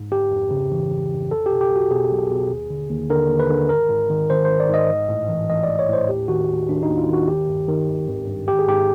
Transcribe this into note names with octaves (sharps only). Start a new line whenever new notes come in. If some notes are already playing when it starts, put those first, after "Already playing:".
Already playing: G#2
G1 G4
F2
C#3
E3
G1
F2
B1 A4
B2 G4
G4
B1 F#4
B2 G#4
B1
B2
D#2
D3
D#2
D3 A#4
D#2
B4
D3
G#1 A#4
G#2
D#3
G#1 C5
G#1 C5
D5
G#2 D#5
A1
A2
E3
A1 D#5
A1 D5
C#5
A2 C5
D#2 G4
D#3 F#4
D#2
D#3 D4
D#4
D#2
F4
D#3 F#4
G#1 G4
G2
D#3
G#1
G#1
G2
G#1 G4
G#4
G#2 G4